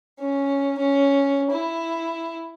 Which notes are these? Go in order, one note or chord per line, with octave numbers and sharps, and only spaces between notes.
C#4
C#4
E4